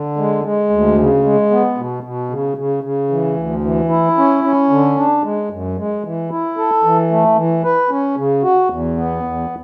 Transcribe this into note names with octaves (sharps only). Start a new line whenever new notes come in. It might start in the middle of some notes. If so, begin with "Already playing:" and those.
Already playing: D3
G#3
G#3
D2
C#3
G#3
B3
B2
B2
C#3
C#3
C#3
E3
D2
E3
E4
C#4
C#4
D3
D4
G#3
F#2
G#3
E3
E4
A4
E3
A3
E3
B4
C#4
C#3
F#4
E2
B3
E2